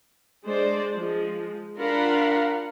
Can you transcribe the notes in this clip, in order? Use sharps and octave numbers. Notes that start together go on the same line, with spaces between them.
G#3 D4 C5 D5
F3 G#3
D4 F4 A#4 F5 F#5 B5